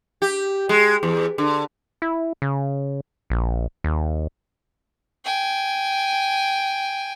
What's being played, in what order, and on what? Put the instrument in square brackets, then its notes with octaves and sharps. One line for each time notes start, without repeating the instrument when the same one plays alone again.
[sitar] G4
G#3
E2
D3
[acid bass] E4
C#3
A#1
D#2
[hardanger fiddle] G5 G#5